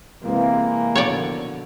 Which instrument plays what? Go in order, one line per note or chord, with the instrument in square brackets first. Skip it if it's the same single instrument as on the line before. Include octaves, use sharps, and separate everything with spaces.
[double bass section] C3 G#3 C4 [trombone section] E3 A#3
[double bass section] A#1 B2 D3 [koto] C#5 D5